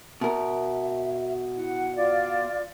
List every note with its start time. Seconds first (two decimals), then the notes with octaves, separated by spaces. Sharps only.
0.21 B2 A#4 E5
1.57 E4 F#5
1.96 F4 D5 F5